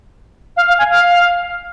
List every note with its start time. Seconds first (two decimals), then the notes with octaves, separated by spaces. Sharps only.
0.56 F5
0.68 F5
0.78 G#5
0.89 F5